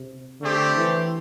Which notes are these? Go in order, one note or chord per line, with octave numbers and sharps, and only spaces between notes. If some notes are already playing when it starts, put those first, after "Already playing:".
Already playing: C3
D3 A3 C4 G4
E3